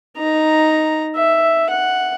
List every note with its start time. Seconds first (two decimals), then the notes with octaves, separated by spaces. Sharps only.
0.18 D#4 A#5
1.16 E5
1.71 F#5